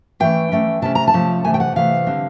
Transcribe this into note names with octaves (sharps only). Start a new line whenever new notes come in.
E3 A3 C#4 G5
E3 A3 C#4
C3 F3 A3 C#4 A5
A#5
A5
C3 F3 A3 C#4
C3 E3 A3 G#5
G5
F#5
C3 E3 A3 F5
D3 G3 C4